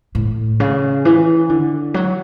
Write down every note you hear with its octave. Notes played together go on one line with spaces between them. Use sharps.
A2
C#3
E3
D3
F#3